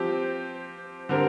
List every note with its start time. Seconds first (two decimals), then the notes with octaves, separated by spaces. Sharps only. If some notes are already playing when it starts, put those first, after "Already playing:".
Already playing: F3 C4 G4
1.09 D3 G3 C4 A#4